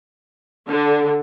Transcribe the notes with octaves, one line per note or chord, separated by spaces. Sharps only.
D3